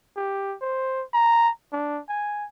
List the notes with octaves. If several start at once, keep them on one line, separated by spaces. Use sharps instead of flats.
G4
C5
A#5
D4
G#5